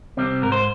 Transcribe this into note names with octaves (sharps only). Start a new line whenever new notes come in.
C3 G3 C4
G#2 A#4
C5